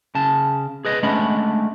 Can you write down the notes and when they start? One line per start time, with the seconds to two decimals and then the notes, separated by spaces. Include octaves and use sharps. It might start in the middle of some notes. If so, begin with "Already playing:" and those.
0.15 C#3 A5
0.85 G#4 B4 D#5
1.03 G#3 A3 C#4 D4 F#5 B5